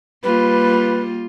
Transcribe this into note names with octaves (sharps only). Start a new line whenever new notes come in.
G3 A#3 F4 B4